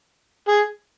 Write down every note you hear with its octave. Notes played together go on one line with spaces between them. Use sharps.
G#4